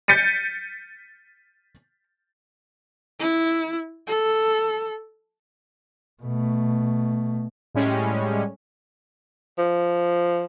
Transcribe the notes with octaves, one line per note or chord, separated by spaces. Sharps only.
G6 A6 B6 C#7 D#7
E4
A4
B2 A3
A2 G3 G#3 C#4
F3